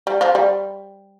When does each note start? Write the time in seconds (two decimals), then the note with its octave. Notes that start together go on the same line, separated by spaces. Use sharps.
0.07 G3
0.21 F3
0.35 G3